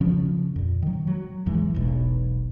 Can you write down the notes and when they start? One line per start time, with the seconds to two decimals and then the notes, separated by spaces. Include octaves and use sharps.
0.01 C#3 F3 C#4
0.56 F2 A#2
0.82 D#3 F#3
1.07 F#3
1.46 A1 E2 E3 G#3
1.74 E1 B1 B2